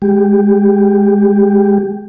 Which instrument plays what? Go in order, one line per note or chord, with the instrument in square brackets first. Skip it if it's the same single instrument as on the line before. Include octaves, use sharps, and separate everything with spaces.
[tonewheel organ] G#3 G4